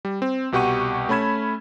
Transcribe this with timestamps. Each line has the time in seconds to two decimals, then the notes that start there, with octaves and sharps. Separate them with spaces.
0.05 G3
0.22 C4
0.52 C2 B2 G4 F#5 C#6 D#7
1.09 A3 C#4 B5 G#6 E7